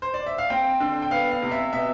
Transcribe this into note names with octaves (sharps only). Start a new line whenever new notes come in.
C5
D5
E5
F5
C4 G5
D3
G5
B3 F5
F5
C3
E5
B2 E5